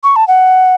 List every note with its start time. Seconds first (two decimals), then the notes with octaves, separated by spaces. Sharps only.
0.04 C#6
0.16 A5
0.28 F#5